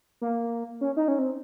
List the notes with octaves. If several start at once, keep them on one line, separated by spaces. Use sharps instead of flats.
A#3
C#4
D#4
C#4
C4